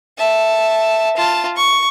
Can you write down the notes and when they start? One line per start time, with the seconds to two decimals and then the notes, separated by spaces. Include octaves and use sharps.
0.18 E5 A5
1.17 F4 A5
1.57 C#6